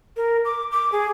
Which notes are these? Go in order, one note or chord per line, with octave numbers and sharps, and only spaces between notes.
A#4
D6
D6
G#4